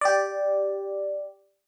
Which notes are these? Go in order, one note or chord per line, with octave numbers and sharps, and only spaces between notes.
G4 D5